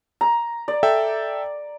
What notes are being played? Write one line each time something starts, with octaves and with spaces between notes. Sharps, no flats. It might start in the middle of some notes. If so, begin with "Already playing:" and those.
A#5
D5
A4 E5 G5